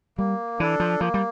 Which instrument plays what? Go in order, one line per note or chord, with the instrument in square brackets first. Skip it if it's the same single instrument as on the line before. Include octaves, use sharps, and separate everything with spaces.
[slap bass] G3 [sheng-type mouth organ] A#3
[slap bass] E3 [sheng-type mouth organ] D4 A4
[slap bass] F3
[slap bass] F3 [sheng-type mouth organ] A#3
[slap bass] G3